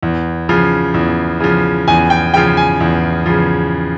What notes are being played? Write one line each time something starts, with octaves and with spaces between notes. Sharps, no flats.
E2
C#3 F3
E2
C#3 F3
E2 G#5
G5
C#3 F3 G5
G#5
E2
C#3 F3